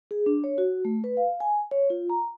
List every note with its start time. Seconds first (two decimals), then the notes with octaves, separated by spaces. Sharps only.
0.11 G#4
0.26 D4
0.44 C#5
0.58 F#4
0.85 A3
1.04 B4
1.17 F5
1.40 G#5
1.71 C#5
1.90 F4
2.10 A#5